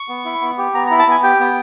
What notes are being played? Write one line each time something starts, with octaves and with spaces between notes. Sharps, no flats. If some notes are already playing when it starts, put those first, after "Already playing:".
Already playing: C#6
B3
E4
B3
G4
B3 A#5
A#5
E4
A5
B3 G#5
G4 G5
B3